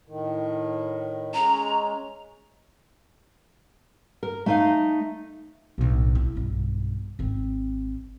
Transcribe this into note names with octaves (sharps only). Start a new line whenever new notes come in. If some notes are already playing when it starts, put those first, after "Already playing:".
A2 D#3
G#3 C#4 A#5
A#4
A3 D#4 F5
D1 B1
E4
B1 G2
G#1 C4